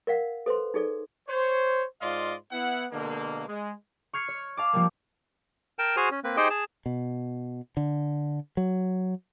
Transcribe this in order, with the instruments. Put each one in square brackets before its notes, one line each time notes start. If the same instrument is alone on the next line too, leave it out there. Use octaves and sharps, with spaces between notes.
[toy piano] A#4 D5 F5 F#5
A4 B4 C5 C6
D#4 G#4 A4 D5
[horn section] C5 C#5
G#2 F4 D5 D#5 F5 C6
B3 E4 F#5
B2 D3 G#3 A#3
G#3
[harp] C#6 F6 G#6 C7 C#7
C#5
F5 A5 D6
F3 G3 A#3
[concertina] A#4 G5 A5
F#4 G#4 C5 G#5 C6 F6
C#4
A#3 C4 B4
D#4 G4 G#4 C5 D#5 G5
G#4 A5
[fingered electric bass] B2
D3
F#3